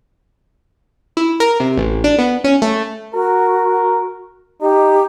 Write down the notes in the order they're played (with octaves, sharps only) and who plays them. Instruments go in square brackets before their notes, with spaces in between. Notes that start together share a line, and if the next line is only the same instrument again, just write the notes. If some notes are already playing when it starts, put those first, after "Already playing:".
[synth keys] E4
A#4
C3
A1
D4
B3
C#4
A3
[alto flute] F#4 [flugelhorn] A#4
[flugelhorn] D#4 [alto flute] G4